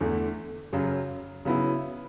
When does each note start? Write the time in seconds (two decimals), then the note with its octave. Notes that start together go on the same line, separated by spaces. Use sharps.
0.01 E2 D3 A3
0.73 F#2 C#3 F#3
1.45 C#3 F#3 B3 E4